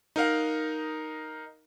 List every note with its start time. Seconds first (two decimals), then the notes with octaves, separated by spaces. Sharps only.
0.16 D#4 A#4 F5 F#5